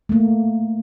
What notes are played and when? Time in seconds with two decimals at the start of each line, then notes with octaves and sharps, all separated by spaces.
0.09 A3 A#3